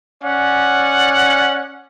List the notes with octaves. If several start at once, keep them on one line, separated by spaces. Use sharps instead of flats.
C#4 D5 F#5